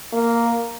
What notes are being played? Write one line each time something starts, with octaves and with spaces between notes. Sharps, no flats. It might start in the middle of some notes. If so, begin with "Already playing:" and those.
A#3